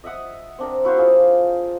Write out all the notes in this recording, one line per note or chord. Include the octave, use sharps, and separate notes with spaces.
D#5 E5 F#5 D#6
C4 D4 A#4
E4 F#4 C5 F5
F4 G#4 F5